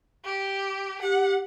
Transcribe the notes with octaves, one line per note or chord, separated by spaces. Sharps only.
G4
G4 F#5